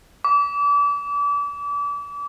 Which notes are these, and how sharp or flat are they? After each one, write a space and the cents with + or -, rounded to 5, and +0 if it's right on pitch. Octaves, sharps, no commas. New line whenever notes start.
D6 -35